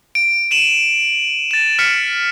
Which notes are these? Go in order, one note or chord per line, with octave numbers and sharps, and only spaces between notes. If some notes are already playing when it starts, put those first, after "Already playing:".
D7
D#7 E7 F#7
A6 E7
F6 B6 C#7